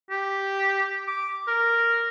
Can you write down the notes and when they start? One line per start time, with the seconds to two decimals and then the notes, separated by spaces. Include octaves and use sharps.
0.10 G4
1.08 D6
1.48 A#4